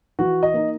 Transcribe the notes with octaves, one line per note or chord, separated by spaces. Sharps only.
E3 F#4
D#5
A#3 D#4